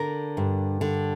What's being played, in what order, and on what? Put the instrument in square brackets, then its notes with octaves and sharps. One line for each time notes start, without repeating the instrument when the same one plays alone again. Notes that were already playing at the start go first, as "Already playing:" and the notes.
Already playing: [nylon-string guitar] D3 A#4
G2
D3